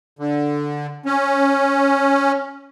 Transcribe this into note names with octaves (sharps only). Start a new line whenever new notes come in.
D3
C#4